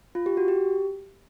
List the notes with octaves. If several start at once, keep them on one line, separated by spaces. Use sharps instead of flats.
F4
G4
F#4
G4